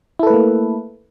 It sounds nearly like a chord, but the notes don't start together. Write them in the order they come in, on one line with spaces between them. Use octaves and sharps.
E4 A4 B4 A3 A#3